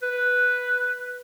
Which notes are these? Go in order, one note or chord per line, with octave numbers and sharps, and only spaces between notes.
B4